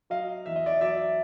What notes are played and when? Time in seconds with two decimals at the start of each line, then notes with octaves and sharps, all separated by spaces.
0.10 F#3 D#5 F5
0.46 E2 E5
0.56 D#5
0.66 D5 E5
0.81 F#3 D5 E5